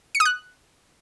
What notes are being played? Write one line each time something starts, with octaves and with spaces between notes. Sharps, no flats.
C#7
D#6
F#6